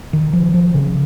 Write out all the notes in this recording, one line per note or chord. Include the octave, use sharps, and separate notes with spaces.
D#3
F3
F3
C#3